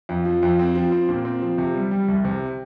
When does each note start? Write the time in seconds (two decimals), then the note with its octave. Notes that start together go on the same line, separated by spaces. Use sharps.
0.09 F2
0.25 F3
0.43 F2
0.59 C4
0.75 F3
0.92 C4
1.09 A#2
1.25 C4
1.42 F3
1.58 C3
1.75 G3
1.91 G3
2.08 C2
2.24 C3